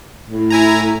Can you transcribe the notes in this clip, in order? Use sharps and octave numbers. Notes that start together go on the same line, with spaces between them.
A2
E4 G#5 A#5